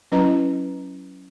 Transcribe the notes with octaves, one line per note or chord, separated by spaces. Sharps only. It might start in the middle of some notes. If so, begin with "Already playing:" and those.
F#3 C#4 E4 B4 D#5 A#5